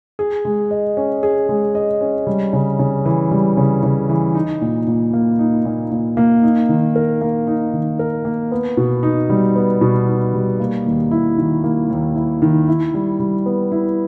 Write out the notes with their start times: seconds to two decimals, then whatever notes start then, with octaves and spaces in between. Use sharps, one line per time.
0.19 G#4
0.45 G#3
0.71 D#5
0.97 C#4
1.23 G#4
1.49 G#3
1.75 D#5
2.01 C#4
2.27 G3
2.53 C#3
2.79 C#3
3.05 E3
3.31 G3
3.57 C#3
3.83 C#3
4.09 E3
4.35 D#4
4.61 A#2
4.87 A#2
5.13 A#3
5.39 D#4
5.65 A#2
5.91 A#2
6.17 A#3
6.43 D#4
6.69 D#3
6.95 A#4
7.21 A#3
7.47 D#4
7.73 D#3
7.99 A#4
8.25 A#3
8.51 B3
8.77 B2
9.03 D#4
9.30 G3
9.56 B3
9.81 B2
10.08 D#4
10.34 G3
10.60 A#3
10.86 D#2
11.11 E4
11.38 D#3
11.64 A#3
11.90 D#2
12.16 E4
12.42 D#3
12.68 E4
12.94 G3
13.20 G3
13.46 B3
13.72 E4